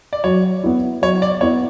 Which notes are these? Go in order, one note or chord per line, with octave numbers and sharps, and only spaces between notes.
D5
F#3 C#5
B3 E4
F#3 C#5
D5
B3 E4 C#5